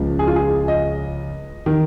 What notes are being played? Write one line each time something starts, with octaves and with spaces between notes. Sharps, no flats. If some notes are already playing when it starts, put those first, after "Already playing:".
Already playing: C#2 C#3 F3
G#4
F4
G#4
D#5
D#3